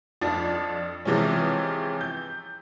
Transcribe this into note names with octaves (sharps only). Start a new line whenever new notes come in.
F2 F3 D4 A6
C3 E3 F3 G#3 C#4
G6